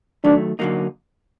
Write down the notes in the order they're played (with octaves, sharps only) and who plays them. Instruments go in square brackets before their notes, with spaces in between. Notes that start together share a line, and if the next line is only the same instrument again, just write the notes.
[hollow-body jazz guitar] D#3 F#3 A3 [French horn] D4
[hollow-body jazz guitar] D3 F#3 A#3 D#4